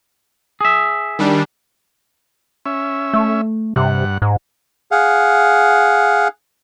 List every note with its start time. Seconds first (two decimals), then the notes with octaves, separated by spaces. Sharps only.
0.61 G#4 E5
1.19 D#3 G3 D4
2.66 C#4 E5
3.14 A3
3.76 G2 C3 F#5
4.22 G#2
4.91 G#4 F5 F#5